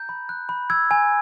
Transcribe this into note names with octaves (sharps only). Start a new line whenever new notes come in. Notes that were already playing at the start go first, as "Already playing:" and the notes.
Already playing: A#5 G6
B5
F#6
B5
E6 G#6
G#5